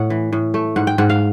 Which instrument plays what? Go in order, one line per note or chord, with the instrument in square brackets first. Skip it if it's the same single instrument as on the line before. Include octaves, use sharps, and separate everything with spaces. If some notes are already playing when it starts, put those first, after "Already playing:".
Already playing: [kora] A2 F#5
E3
A2
A3
G#2 F#5
G5
G#2 F#5
F5